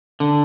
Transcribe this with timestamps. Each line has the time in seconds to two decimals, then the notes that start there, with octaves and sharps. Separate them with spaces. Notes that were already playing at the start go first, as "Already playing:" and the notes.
0.20 D3